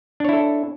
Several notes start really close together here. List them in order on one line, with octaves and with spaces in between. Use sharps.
D4 C#5 E4 A4